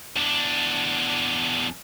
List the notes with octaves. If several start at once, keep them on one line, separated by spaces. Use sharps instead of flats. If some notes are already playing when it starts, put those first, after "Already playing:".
E2 D4